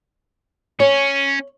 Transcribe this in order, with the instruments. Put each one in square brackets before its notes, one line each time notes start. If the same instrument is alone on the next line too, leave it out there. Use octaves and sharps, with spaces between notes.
[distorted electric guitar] C#4 [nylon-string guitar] C#5